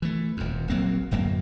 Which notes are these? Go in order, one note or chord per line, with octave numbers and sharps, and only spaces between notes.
E3 A3
D#1 F2
A#1 F#3 A#3 C4
D1 F#2 F#3 A#3